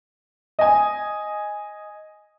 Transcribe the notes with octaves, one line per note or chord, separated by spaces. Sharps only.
D#5 G#5